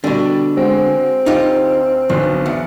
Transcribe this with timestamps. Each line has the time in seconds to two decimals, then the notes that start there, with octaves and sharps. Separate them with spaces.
0.04 B2 D3 G3 D4
0.57 G#3 C4 F#4
1.26 D2 D#4 F4 G4
2.09 B1 B2 D3
2.46 E2 F#5